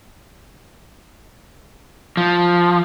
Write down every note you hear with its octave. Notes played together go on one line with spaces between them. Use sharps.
F3